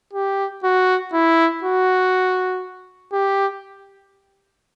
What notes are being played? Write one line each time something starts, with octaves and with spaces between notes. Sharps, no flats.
G4
F#4
E4
F#4
G4